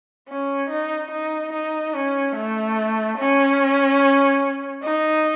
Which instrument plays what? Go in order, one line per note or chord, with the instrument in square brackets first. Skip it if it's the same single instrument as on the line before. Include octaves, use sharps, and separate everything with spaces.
[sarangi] C#4
D#4
D#4
D#4
C#4
A3
C#4
D#4